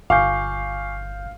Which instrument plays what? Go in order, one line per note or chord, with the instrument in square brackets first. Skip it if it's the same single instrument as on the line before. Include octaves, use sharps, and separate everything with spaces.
[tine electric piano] G1 G6 [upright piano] F5 [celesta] G#5 C#6 D6